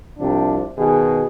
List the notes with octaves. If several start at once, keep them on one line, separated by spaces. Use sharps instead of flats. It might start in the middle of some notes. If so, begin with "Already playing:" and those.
C2 C3 F3 D4
B2 D#3 G#4